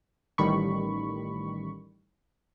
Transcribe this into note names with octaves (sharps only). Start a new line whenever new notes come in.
A1 D#3 G3 B5 C#6